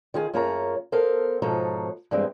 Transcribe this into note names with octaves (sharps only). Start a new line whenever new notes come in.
D#3 F4 G#4
F#2 A#3 F4 G#4 C#5 A#5
B3 A4 A#4 C5 F5
G#2 B2 F3 A4 C#5 A#5
G2 E3 G3 G#3 C4